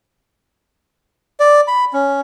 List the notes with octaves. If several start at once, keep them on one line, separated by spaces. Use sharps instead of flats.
D5
B5
C#4